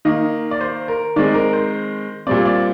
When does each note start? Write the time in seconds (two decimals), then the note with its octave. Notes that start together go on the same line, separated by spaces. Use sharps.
0.05 D#3 A#3 D#5
0.51 D5
0.61 C5
0.88 A#4
1.16 D#3 G#3 C4 D5
1.34 A#4
1.53 C5
2.27 A#2 G3 C4 D5
2.45 D5